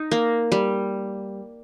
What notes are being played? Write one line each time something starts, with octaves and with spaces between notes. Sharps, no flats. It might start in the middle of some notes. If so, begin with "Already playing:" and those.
Already playing: D#4
A#3
G3